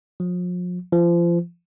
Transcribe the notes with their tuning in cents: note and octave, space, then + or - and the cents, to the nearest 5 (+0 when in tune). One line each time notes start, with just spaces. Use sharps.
F3 +40
F3 -30